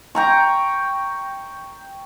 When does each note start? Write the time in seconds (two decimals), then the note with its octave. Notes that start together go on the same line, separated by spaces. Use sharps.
0.15 G5 A#5 C#6